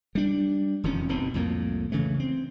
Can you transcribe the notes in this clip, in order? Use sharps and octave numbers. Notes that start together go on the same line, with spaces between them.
G3 D4
E1 F2 D#3 C#4
F1 B2 D#3 C4
C2 F2 A2 A#3
C#3 E3 A3
C4